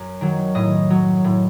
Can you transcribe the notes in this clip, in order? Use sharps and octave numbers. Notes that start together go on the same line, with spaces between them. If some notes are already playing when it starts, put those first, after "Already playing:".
Already playing: F#2
D#3 F#3
A2 D#5
F#3
A2